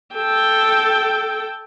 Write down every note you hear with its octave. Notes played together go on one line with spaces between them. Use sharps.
A4 G5